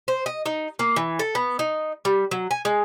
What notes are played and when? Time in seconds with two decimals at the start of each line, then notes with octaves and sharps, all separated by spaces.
0.08 C5
0.26 D#5
0.46 D#4
0.79 A#3
0.96 E3
1.19 A4
1.35 B3
1.59 D#4
2.05 G3
2.31 F#3
2.51 G#5
2.65 G#3